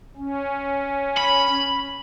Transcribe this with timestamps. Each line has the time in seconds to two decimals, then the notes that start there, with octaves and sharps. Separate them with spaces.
0.17 C#4
1.17 B5